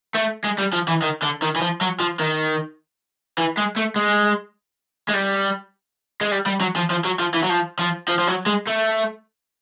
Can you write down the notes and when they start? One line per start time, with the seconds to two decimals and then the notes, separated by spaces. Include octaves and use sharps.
0.15 A3
0.44 G#3
0.58 G3
0.73 F3
0.88 E3
1.02 D#3
1.23 D3
1.42 D#3
1.56 E3
1.61 F3
1.81 F#3
2.00 F3
2.20 D#3
3.38 E3
3.58 G#3
3.77 A3
3.96 G#3
5.09 G#3
5.14 G3
6.21 G#3
6.32 G3
6.46 G3
6.61 F#3
6.76 F3
6.90 F3
7.04 F#3
7.19 F3
7.34 E3
7.43 F#3
7.49 F3
7.79 F3
8.08 F3
8.19 F3
8.28 F#3
8.46 G#3
8.67 A3